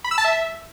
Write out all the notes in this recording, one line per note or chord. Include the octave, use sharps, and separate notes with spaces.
B5
E6
A5
E5